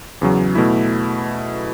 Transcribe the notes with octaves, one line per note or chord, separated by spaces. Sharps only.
E2 C#3 F#3
B2 A3 E4